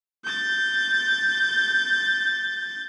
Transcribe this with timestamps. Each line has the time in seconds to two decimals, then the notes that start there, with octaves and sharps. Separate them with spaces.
0.24 G6 A6